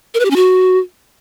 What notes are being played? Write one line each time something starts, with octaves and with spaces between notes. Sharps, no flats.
A#4
B4
G4
C#4
F#4